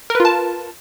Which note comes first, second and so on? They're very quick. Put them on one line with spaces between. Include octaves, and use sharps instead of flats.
A#4 B4 F4 A5